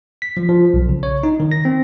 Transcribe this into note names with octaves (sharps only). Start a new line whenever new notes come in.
B6
F3
F3
B1
C#3
C#5
D#4
D#3
A#6
C4